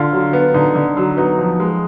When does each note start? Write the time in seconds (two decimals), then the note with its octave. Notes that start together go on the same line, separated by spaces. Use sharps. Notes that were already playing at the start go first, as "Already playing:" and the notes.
Already playing: D3 F4
0.13 F#3
0.33 B3
0.54 D3 D#4
0.75 D3
0.97 F#3
1.17 B3 D#4 F#4
1.38 F3
1.60 G#3